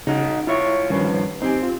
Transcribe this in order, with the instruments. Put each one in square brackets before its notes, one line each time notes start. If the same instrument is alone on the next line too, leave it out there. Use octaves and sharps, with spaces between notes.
[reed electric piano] C#3 [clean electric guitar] D#4 F#4
[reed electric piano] E4 [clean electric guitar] F4 C#5
[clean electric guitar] G2 F3 [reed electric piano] D#3 C#4 B4
[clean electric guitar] C4 [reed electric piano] D#4 G4 G#5
[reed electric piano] F4